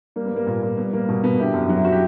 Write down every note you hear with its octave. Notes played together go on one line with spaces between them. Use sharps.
G3 A#3
B3
G3 A#3
A#2
A#2
G3 B3
G3 A#3
B2 B3
B2 B3
D3 E4 G4
F#2
F#3
E4
F#4
G4